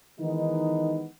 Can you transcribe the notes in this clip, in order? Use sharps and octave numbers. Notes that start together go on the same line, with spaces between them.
D#3 E3 G#3 B3 D#4